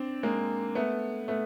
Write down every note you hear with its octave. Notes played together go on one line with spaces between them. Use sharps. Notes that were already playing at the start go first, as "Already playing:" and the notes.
Already playing: C4 D4
G#3 A#3
A3 B3
A3 B3